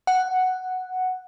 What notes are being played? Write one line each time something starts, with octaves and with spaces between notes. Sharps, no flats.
F#5